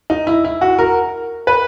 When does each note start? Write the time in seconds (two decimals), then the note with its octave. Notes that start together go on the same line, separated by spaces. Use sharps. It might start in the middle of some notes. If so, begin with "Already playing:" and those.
0.10 D#4
0.27 E4
0.45 E4
0.61 F#4
0.79 A#4
1.47 B4